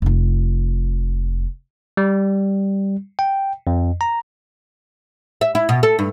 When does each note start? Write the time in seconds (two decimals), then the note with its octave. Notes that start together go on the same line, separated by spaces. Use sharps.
0.02 F1 F4
1.97 G3
3.19 G5
3.67 F2
4.01 A#5
5.41 E5
5.55 E4
5.69 B2
5.83 A4
5.99 G2